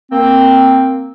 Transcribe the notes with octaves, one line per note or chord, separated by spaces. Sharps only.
A#3 C4